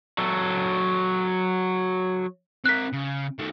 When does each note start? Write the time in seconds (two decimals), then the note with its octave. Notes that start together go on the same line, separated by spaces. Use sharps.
0.18 F#3 A4
2.66 C4 A#4 F#6 B6
2.93 C#3
3.39 D#3 A3